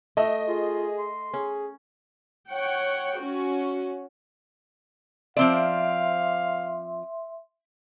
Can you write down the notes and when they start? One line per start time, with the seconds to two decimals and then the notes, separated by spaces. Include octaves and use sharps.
0.17 A3 D#5
0.48 F4 G#4
0.98 C6
1.34 C#4 G#4
2.48 C#5 F#5 G5
3.17 C#4 F#4
5.37 F3 C4 D5 E5 F5 C6